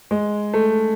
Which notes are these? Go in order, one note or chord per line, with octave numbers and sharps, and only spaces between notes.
G#3
A3